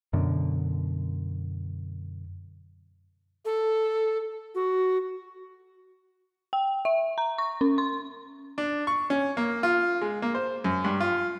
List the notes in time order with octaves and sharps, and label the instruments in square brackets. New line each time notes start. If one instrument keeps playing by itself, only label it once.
[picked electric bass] F#2 B2 D3
[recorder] A4
F#4
[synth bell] G5
E5
A#5
C#6
C#4
C6
[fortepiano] D4
C#6
C#4
A#3
F4
G#3
A#3
C5
F#2
G2
F4